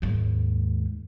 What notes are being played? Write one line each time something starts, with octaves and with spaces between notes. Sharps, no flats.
D#2 G#2